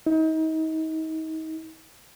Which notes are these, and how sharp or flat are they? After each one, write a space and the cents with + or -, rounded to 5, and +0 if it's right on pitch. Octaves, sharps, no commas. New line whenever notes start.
D#4 +35